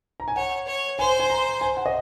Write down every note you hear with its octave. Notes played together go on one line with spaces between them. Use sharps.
A#5
G#5
C#5 F#5
C#5
C5 G#5
G#5
A#5
G#5
F#5
D#5